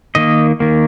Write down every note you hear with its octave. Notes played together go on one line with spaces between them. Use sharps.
D#3 A#3 D#5
D#3 A#3